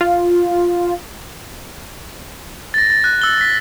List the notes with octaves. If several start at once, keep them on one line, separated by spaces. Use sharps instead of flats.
F4
A6 A#6
A6
F#6
E6 G7
B6